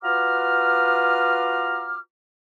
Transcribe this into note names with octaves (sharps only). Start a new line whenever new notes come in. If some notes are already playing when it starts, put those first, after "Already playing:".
F4 F#4 B4 A#5 D6 F6